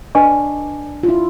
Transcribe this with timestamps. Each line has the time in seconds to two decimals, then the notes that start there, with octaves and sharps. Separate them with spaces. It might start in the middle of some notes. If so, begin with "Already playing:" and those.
0.15 D4 B4 D#5 G#5 C#6
1.03 F4
1.09 E4